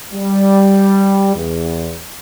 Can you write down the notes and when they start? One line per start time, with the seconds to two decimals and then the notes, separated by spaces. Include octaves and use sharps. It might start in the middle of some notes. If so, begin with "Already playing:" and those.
0.14 G3
1.36 E2